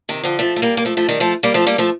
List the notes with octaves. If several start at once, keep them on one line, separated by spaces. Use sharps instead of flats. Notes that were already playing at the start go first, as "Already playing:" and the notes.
C3 D#3
D3 F3
F3 A3
A3
G3 A#3
A#3
F3 A3
F3 A3
D#3 G3
F3 A3
G3 A#3
F3 A3
G3 A#3
F3 A3